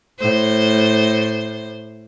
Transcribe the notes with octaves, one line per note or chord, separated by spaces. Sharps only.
A2 C5